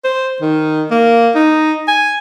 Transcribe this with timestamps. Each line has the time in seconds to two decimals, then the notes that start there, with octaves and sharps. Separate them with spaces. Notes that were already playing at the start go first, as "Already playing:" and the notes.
0.04 C5
0.41 D#3
0.91 A#3
1.35 D#4
1.88 G#5